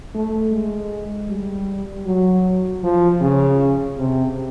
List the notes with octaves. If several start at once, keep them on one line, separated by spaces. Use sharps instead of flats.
A3
G#3
G3
F#3
F3
C#3
C3